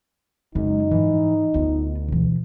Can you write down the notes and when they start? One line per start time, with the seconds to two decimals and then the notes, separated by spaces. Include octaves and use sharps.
0.55 F#2 C#3 G#3 D#4
0.91 G#2 E3 F3
1.54 D2 B3 F4
2.08 B2 E3